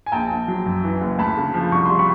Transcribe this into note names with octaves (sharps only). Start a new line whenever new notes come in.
G#5
A#1 G5 A5
A#1
F#3
F#2
E3
F#1
D2 A5 B5
C#3
F3
C2 C#6
G3 C6
B5 C#6